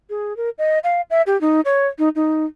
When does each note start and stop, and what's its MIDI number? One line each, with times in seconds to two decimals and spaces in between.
0.10 0.36 68
0.37 0.50 70
0.58 0.79 75
0.84 1.01 77
1.10 1.22 76
1.27 1.39 67
1.41 1.61 63
1.65 1.87 73
1.98 2.09 63
2.15 2.45 63